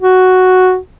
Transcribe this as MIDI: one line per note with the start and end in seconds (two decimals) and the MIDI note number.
0.01 0.77 66